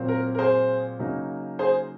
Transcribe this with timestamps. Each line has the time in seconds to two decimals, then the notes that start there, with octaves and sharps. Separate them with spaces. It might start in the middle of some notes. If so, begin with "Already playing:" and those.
Already playing: A#2 F#3 C4
0.08 A#4
0.35 A#4
0.39 G#4 C5
0.99 C#3 F#3 A#3 D#4
1.59 G#4 C5